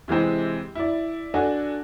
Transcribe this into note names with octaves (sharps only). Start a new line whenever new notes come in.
C3 E3 G#3 C4
E4 D5
D4 F#4 A4 G#5